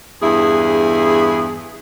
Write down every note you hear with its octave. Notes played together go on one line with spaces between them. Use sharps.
E2 G2 E4 G#4